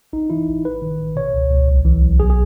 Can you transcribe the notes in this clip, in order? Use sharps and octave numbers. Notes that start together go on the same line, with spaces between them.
A1 D#4
E3 E4
A1
A1 B4
D#3
A1
B2 C#5
C#2
C#2
B1
E3
B1
B1 G#4
G#4